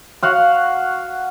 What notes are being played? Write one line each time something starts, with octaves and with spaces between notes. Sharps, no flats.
F#4 F5 F#5